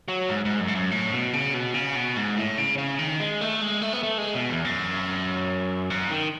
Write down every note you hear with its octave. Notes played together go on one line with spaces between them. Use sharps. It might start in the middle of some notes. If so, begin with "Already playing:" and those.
F#3
G#2
G#2
F#2
G#2
F#2
A2
B2
C#3
B2
C#3
B2
G#2
A2
C#3
C#3
D#3
G#3
A3
G#3
A3
B3
A3
G#3
B2
E2
F#2
G#2
D#3